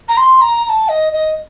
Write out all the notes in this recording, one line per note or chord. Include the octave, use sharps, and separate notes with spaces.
A#5
C6
A#5
A#5
A5
D#5
D#5